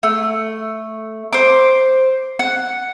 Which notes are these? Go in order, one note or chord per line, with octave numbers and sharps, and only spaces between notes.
A3
C5 D6
F#5